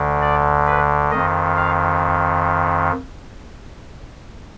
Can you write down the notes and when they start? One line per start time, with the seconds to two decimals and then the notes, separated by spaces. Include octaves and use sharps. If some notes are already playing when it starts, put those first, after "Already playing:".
Already playing: D2 D3
0.22 D5
0.67 B4
1.11 F2 D#3 D#5
1.57 F5